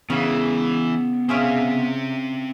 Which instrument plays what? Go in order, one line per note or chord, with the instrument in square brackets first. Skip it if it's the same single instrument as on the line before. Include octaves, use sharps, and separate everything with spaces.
[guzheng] C#3 [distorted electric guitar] E3 [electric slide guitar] B3 F5
[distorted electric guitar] C4 E5 [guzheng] C#4 F4 G#4